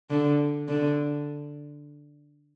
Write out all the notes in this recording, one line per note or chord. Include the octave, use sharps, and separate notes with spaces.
D3
D3